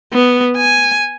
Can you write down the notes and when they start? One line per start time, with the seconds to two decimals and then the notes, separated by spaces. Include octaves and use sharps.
0.13 B3
0.57 G#5